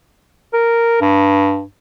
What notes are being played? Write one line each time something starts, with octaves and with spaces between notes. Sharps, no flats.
A#4
G2